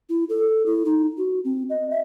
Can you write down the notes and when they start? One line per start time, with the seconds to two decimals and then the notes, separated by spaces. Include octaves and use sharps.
0.09 E4
0.29 A4
0.66 E4
0.85 D#4
1.18 F#4
1.45 C4
1.70 D#5
1.91 E5